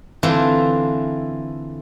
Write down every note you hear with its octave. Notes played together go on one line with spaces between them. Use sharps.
D3 E3 A3 C4 E4 F4